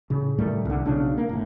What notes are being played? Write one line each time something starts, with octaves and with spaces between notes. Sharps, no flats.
A2 C#3
A2 D#3 G3 A3
C2 D3
B1 C#3 D4
A#3
G1 A2